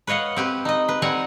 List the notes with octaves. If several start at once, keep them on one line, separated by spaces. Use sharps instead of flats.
B4 C#5 D#5 F5 F#5
C4 G4 B4
D#4 D#5
B4
G3 C4 F#5 G#5 A#5